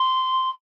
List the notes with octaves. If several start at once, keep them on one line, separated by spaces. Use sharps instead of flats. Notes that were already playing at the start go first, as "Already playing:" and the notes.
Already playing: C6